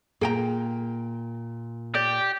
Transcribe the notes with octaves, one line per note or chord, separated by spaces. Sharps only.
A#2 G#4 G5 A#5
G4 D5